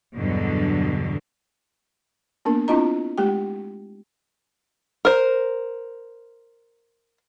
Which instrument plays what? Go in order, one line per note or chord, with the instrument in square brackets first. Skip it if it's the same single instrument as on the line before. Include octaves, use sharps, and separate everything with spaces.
[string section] E2 G2 B2 D3 F#3
[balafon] A#3 B3 D4 A#4
C4 D4 E4 F4 D#5 A#5
G#3 A3 G4 G5
[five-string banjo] A#4 C5